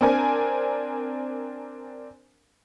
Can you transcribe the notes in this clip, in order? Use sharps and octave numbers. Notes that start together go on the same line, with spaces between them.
C4 D4 A#4 G#5